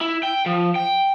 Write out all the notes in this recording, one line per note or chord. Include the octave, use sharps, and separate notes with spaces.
E4
G5
F3
G5